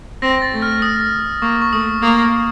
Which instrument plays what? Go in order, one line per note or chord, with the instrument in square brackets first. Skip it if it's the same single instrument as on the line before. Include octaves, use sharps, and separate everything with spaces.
[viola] C4 [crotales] A#6
[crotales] A6
[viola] A3
[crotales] F6
D#6
[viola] A#3 [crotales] C#6
[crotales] C#6
[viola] A3 [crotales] D#6
[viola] A#3 [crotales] D#6